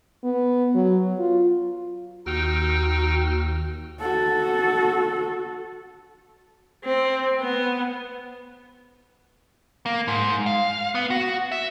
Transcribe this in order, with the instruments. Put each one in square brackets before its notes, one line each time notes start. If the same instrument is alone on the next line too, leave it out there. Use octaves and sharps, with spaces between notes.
[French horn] B3
F#3
F4
[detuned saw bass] D#2 [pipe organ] D#4 G5 [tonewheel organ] F#4 E6 F6
[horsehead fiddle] F#4 A4
[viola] C4
B3
[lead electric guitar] A#3
G#2
F5
B3
F#4
E5